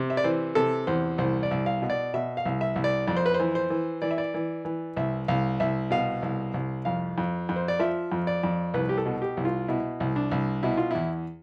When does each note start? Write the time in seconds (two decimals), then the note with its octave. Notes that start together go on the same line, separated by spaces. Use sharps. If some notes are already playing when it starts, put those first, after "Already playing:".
Already playing: C3
0.10 E5
0.17 D5
0.24 E3 C5
0.55 C3 A4
0.87 E2 C5
1.18 C2 C5
1.43 D5
1.51 C2
1.66 F5
1.82 B2
1.90 D5
2.14 B2 E5
2.37 F5
2.45 C2
2.61 E5
2.76 C2
2.84 D5
3.07 F2 D5
3.17 C5
3.26 B4
3.34 C5
3.40 E3
3.55 C5
3.70 E3
4.02 E3 D5
4.11 E5
4.18 D5
4.34 E3
4.65 E3
4.97 C2 E5
5.28 C2 F5
5.60 C2 E5
5.91 B2 F5
6.23 C2
6.54 C2
6.85 F2 F5
7.18 F2
7.49 F2
7.56 C5
7.68 D5
7.79 F3 E5
8.12 F2
8.27 D5
8.44 F2
8.74 C2 B4
8.89 G4
8.98 A4
9.06 B2
9.22 G4
9.37 C2
9.45 F4
9.68 B2 E4
10.00 C2
10.16 D4
10.31 C2
10.63 B2 E4
10.77 F4
10.91 E2 E4